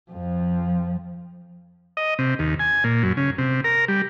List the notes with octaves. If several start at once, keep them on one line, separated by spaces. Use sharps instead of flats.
F2 F3
D#5
C3
D#2
G#5
A#2
F#2
C#3
C3
A#4
G3